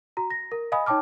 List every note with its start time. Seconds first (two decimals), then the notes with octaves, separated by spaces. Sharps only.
0.17 F#4 A#5
0.30 A#6
0.52 A#4
0.72 D#5 F5 G#5 B5 D#6
0.86 D#4 C#5 G5 A5 D6 F6